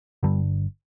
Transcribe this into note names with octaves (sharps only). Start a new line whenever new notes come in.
G1 G2 D3 G3